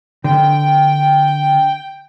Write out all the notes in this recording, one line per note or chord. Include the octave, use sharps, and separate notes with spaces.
D3 G5